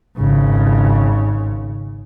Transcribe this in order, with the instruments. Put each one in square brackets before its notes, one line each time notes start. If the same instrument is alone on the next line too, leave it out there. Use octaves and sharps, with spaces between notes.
[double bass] G#1 C#3